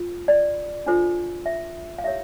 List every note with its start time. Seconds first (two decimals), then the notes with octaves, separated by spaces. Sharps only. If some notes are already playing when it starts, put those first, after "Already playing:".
Already playing: F4
0.28 D5
0.86 D4 F4 A4 C5
1.46 E5
1.98 F5
2.04 E4 G4 A#4 C#5 E5